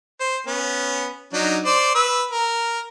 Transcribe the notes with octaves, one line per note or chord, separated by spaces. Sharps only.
C5
B3 C#4
F#3 D4 D#4
C5 D5
B4 E6
A#4